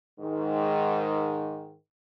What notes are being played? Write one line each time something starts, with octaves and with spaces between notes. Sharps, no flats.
G#2 D#3